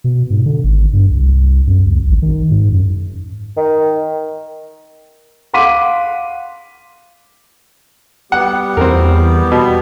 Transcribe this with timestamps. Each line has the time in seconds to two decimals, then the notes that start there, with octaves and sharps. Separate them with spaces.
0.04 B2
0.30 G#2
0.46 D3
0.64 G#1
0.93 G2
1.11 C2
1.67 F#2
1.85 C#2
2.08 A1
2.22 D#3
2.51 G#2
2.72 F#2
3.57 D#3
5.54 F5 F#5 C6 D6 B6 D#7
8.32 G3 B3 G4 F#5
8.77 E2 C4 A#4
9.52 B2